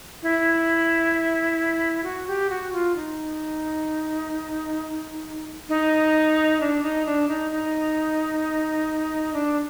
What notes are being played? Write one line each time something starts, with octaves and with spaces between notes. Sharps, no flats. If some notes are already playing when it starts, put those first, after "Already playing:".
E4
F#4
G4
F#4
F4
D#4
D#4
D4
D#4
D4
D#4
D#4
D4